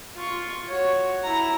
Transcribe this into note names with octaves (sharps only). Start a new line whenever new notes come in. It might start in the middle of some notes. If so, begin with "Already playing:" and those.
F4 C#6
F#4 C#5
E4 A#5